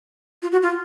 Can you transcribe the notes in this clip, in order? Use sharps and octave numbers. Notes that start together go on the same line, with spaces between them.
F4
F#4
F4